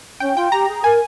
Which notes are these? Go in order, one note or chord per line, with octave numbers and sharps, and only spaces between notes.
C#4 G5
F4 G5
G4 A#5
G#4
A#4 G#5